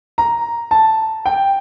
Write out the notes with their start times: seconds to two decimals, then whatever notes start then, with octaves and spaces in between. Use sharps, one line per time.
0.18 A#5
0.71 A5
1.26 G5